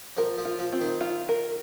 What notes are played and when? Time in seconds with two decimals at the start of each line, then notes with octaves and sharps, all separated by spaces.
0.17 F3 A#4
0.38 F3
0.45 F4
0.59 F3
0.73 C4
0.81 D#3
1.01 F4
1.29 A#4